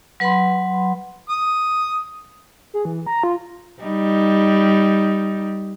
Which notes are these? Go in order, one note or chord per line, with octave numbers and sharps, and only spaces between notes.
F#3 B4 F#5 B5 C6
D#6
G#4
E3
A#5
F4
G3 D#4